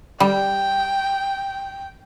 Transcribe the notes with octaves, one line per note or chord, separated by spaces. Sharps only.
G3 G5